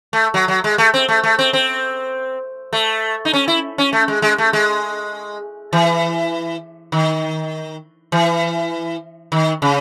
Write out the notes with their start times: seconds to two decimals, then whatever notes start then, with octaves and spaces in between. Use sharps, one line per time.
0.13 A3
0.34 F#3
0.48 F#3
0.64 G#3
0.78 A3
0.94 C4
1.08 A3
1.24 A3
1.39 C4
1.53 C4
2.73 A3
3.25 D#4
3.33 C#4
3.48 E4
3.78 C#4
3.93 A3
4.08 G#3
4.22 G#3
4.38 A3
4.53 G#3
5.73 E3
6.92 D#3
8.12 E3
9.32 D#3
9.62 C#3